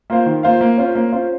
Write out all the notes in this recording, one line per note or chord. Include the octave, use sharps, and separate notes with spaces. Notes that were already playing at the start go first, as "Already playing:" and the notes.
A#3 F4 C5 F5
D#3
A#3 F4 C5 F5
A#3
C#4 F4 C5
A#3
C#4 F4 C5